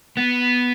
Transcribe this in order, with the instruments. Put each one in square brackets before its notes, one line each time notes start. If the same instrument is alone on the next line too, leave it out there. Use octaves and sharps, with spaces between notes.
[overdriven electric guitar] B3